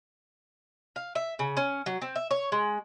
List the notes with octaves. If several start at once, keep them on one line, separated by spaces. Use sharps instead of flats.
F5
E5
C#3
C#4
F#3
C4
E5
C#5
G#3